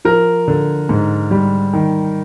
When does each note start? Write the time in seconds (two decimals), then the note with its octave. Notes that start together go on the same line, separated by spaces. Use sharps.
0.05 F3 A#4
0.48 D3
0.89 G#2
1.31 G3
1.73 D#3